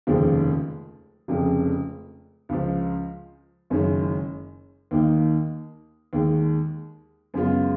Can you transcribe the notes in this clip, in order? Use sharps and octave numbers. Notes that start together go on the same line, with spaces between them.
F1 D#2 C#3 F3 G#3
F1 F2 C#3 G#3
C#2 C#3 F3
F#1 F#2 D#3 G#3 C#4
D#2 D#3 A#3 D#4
D#2 D#3 G#3
F#2 C#3 G#3 B3 F4